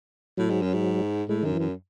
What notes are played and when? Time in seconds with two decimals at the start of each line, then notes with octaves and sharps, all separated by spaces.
0.37 A2 F#3
0.50 G#2
0.62 F#2
0.74 G#2
1.29 A2 G#3
1.42 F#2 D#3
1.52 E3
1.60 F#2